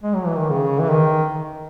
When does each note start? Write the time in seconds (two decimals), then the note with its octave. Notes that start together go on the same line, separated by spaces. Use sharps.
0.03 G#3
0.15 F#3
0.26 E3
0.38 D#3
0.50 C#3
0.79 E3
0.90 D#3